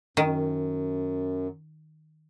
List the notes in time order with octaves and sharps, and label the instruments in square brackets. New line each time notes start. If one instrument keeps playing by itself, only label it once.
[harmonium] F#2 [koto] D#3